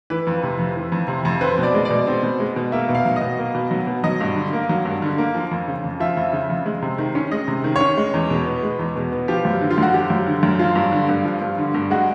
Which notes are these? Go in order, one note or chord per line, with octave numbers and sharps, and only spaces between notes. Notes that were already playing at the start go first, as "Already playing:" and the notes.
E3 B4
F2
C3
F2
E3
F2
C3
F2
C4 B4
B2
D5
G#3
D5
B2
C4
B2
G#3
B2
A#3 E5
B2
F5
F#3
D#5
B2
A#3
B2
F#3
B2
F#3 D#5
G2
D3
A#3
F#3
G2
D3
A#3
F3
F2
C#3
F2
F3 E5
F2
C#3
F2
G#3
C3
D#3
C#4
G#3 D#5
C3
D#3
C#4 C#5
G#3
E2
B2
B3
G#3
E2
B2
B3
F3 G4
F#2
D3
F4
F#2 F#4
F3 G4
F#2
D3
F#2
F3 F4
G2
D3
G2
F3
G2
D3
G2
G#3 F#4